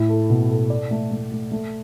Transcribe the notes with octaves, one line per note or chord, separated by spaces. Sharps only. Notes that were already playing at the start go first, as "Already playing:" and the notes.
Already playing: A2 E4
A4
B2
A4
D5
A3
A3
A3
A3